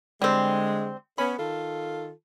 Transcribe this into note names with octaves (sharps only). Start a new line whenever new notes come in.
D3 G3 G#3 C4
B3 C#4 B5
D#3 F4 A4